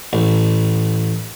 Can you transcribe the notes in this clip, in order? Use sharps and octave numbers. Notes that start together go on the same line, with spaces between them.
A1